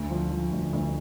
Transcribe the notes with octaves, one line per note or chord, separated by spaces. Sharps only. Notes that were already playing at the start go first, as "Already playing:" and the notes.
Already playing: D2
F3
F3
D2
D2